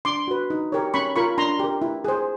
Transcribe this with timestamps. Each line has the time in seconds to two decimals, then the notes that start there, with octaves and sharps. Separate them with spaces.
0.05 D4 C6 D6
0.28 F#4 B4
0.50 D#4
0.72 G4 A#4 C#5
0.94 C#4 B5 C#6
1.16 F4 A#4 B5 C#6
1.38 D4 A#5 C6
1.60 G4 A#4
1.82 E4
2.04 G#4 C5